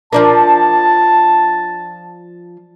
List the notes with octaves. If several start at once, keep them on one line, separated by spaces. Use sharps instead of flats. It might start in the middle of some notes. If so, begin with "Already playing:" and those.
F3 D4 A#4 A5